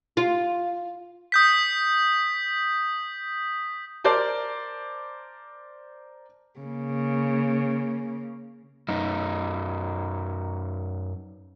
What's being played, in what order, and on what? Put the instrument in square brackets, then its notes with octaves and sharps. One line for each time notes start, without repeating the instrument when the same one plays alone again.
[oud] F4
[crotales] D#6 G6 B6
[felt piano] A#4 C5 D5 A5
[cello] C#3 A#3
[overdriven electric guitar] F#2 D#4